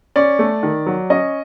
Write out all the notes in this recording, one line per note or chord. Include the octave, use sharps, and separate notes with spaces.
C#4 D5
A3
D#3
F#3
C#4 D#5